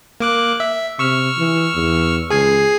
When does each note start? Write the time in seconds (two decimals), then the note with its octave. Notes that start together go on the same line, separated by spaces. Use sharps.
0.20 A#3 D6 F#6
0.60 E5
0.99 C3 C#6 E6 F6
1.38 E3
1.75 E2
2.30 C#2 G#4 G#5 C7